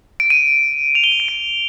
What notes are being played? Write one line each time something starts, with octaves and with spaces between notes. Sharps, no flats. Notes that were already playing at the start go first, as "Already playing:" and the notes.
D7
D#7
F7
G7
F7
D#7
D7